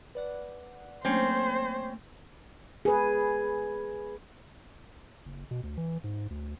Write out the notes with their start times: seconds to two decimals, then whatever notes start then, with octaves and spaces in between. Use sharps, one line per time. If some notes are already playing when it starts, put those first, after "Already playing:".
0.15 B4 D5 F#5
1.05 F#3 A3 A#3 C4 C#4 C5
2.85 G#4 B4
5.25 F#1
5.51 B2
5.63 D2
5.77 E3
6.04 G#2
6.30 D2